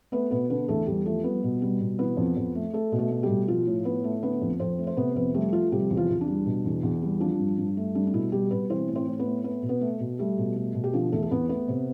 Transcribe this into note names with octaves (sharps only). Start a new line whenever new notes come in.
A3 B3 B4
B2 B3 B4
D3 B3 B4
E2 A3 A4
E2 G3 G4
F3 A3 A4
G3 B3 B4
B2
G3
B2
E3 B3 B4
F2
F2
A3
A3 A4
B2
A3 A4
A3
G3 G4
B2
F3 F4
A2
A2 B3 B4
A3
D3 B3 B4
F2
F2 C4 C5
A3
C5
C3 B3 B4
F2 B3 B4
G3 A3 G4
F3 F4
C3 G3 G4
E2
F3 F4
E2
D4
G3
B2
E2
E2
G3
F3 D4
G2
G2
A3
G3 D4
D4
B2 E4
G3 G4
B2 B3 B4
E3 C4 C5
A2
C4 C5
A2
B3 B4
A3
A3 B3 B4
B2
B3 B4
A3
B2
G3 A3 G4
B2
A3
B2
G4
D3 F3 F4
E2 A3 A4
A4
E2 B3 B4
A3 B3 B4
C3